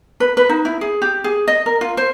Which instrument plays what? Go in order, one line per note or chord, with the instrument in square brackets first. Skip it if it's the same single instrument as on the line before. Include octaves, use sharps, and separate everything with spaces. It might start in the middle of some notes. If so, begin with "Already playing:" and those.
[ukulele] B4
B4
D#4
E4
G#4
G4
G#4
D#5
A#4
F4
C5